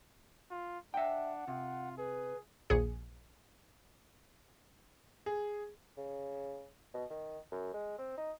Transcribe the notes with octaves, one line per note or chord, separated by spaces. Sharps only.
F4
D4 E5 F#5 G5
C3 F4
G#4 B4
A#1 D#2 G#4 C#7
G#4
C#3
B2
D#3
F#2
G#3
C4
D#4